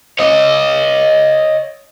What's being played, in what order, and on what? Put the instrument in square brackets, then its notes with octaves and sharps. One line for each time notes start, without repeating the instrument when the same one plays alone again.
[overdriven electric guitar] C#5 D#5